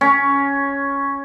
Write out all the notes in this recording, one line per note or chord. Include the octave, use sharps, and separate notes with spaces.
C#4